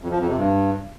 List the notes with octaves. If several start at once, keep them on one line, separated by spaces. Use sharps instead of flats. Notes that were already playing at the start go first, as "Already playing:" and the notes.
F2
F3
F2
C3
G2